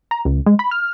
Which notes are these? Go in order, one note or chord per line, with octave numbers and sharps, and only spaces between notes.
A#5
C#2
G#3
B5
F6